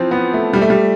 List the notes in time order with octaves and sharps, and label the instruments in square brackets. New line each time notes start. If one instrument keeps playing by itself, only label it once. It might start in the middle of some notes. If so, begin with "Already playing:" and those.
Already playing: [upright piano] E3 F3 C4
B3
A3
G3
A3
G3